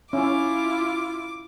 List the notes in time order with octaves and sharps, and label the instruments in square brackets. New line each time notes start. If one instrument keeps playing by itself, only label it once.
[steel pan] C#4 [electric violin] E4 F4 [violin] D6